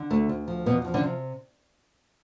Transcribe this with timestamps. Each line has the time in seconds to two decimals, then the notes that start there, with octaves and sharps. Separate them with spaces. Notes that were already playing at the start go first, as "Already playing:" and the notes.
Already playing: D3
0.10 D2 A3
0.29 D2
0.48 F3
0.66 E2 B2 B3
0.85 F3
0.94 D3 D4
1.03 C3